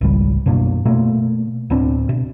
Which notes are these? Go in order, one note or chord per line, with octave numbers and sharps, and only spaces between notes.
G#1 C#2 G3
F#2 B2 A#3 D4
B2 A3 A#3
D1 B3 C4 D4
B2